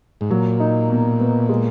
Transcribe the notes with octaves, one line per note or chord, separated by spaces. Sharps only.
G#2
A#2 F#3
D#4
B2
B3
G#3